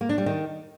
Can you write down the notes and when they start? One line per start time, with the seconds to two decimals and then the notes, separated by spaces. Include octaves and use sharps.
0.01 A#3
0.09 D4
0.18 G3
0.26 D#3